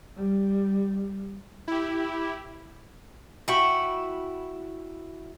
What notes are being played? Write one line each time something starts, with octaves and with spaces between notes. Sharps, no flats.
G3
E4 G4
E4 F#4 G5 B5 C#6